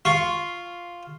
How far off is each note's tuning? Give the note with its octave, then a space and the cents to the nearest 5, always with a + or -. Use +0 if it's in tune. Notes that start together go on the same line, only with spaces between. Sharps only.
F4 +0 C#6 +0